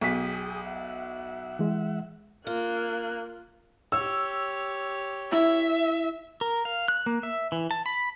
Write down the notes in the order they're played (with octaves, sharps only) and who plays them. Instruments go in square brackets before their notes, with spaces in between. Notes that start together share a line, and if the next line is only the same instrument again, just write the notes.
[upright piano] B1 B6 [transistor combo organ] G#4 G5 D#6
[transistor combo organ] E5 F#5
[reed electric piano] E3 G#3
[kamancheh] A#3 F#6 [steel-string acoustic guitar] F4
[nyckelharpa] G4 C#5 [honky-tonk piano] E6
[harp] E4 [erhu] E5
[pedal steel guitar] A#4
F5
F#6
A#3
E5
E3
A5
B5